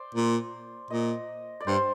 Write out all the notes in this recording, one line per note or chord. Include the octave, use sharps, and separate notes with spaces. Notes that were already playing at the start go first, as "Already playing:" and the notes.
Already playing: C5 D5
A#2
A#2 D#5
D5
G2 C5